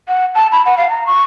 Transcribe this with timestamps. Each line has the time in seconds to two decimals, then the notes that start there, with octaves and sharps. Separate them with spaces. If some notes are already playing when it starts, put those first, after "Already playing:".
0.08 F#5
0.35 A5
0.52 B5
0.66 F#5
0.78 F5
0.90 A#5
1.06 C#6